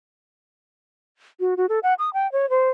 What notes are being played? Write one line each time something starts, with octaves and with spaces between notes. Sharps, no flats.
F#4
F#4
A4
F#5
D#6
G5
C#5
C5